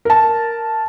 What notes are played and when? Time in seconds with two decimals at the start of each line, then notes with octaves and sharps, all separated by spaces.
0.05 A#4 A5